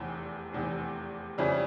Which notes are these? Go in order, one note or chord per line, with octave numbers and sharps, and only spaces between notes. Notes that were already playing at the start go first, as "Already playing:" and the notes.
Already playing: F1 E2 C3 E3
F1 E2 C3 E3
F2 C#3 G3 C#4 E4